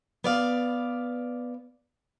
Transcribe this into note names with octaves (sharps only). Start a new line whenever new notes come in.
B3 D5 F5